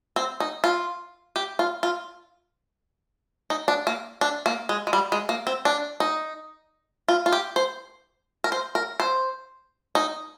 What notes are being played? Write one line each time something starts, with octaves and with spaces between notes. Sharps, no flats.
C4
D#4
F4
G4
F4
F4
D#4
D4
A#3
D4
A#3
G#3
G#3
G3
G#3
A#3
C4
D4
D#4
F4
F4
G4
C5
A#4
C5
A#4
C5
D#4